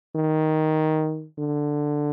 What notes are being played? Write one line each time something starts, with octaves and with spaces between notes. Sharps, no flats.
D#3
D3